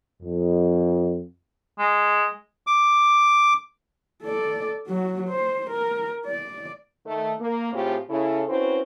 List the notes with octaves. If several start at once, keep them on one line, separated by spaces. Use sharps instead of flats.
F2
G#3
D6
A4 D5
F#3 F#4
C5
A#4
D5
D#3 A3
A#3
A2 A3 C4 F4 G4 G#4
C#3 E4 A4
C4 C#4 E4 F#4 B4 C5